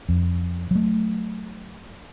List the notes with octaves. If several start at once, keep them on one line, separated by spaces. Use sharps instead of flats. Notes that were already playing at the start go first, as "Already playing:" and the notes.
F2
F#3 A3